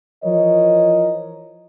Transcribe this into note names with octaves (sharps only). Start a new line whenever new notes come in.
E3 F3 A#4 C#5 D#5